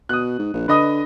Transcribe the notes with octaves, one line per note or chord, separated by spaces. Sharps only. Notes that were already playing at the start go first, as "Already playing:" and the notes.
B2 D#6 F#6
G#2
A#1
D3 B4 D#5 D#6